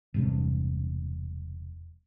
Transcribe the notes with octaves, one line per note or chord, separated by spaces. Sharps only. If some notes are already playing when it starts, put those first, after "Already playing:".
E1 G2 C3